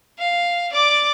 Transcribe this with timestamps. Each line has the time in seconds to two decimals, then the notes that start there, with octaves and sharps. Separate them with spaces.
0.19 F5
0.73 D5 D6